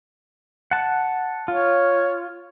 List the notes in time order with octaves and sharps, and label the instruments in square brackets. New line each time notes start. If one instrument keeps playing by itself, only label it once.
[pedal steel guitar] F#5 A5
[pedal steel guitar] F4 [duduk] C#5